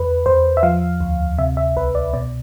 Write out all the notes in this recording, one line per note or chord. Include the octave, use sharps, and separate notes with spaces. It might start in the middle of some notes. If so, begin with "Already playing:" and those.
Already playing: E2 B4
E2 C5
E5
F3 F5
D2
C3 E5
E5
C2 B4
D5
B2 D5